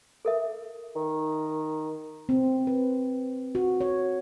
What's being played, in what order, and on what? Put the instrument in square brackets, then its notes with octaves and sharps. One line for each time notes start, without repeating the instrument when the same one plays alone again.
[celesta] A4 A#4 E5
[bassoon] D#3
[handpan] C4
B4
F#4
C#5